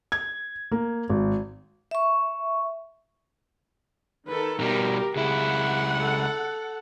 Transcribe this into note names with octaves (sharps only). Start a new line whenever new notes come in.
G#6
A#3
G#1
E5 C#6
D#3 A4 B4
B2 G3 G4 A#4
C#2 E4 G#4 F#5
A4